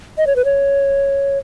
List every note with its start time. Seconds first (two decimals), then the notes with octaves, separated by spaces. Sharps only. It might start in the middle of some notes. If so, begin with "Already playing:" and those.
0.18 D#5
0.27 C#5
0.36 B4
0.45 C#5